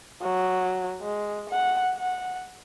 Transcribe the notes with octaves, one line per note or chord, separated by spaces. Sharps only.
F#3
G#3
F#5
F#5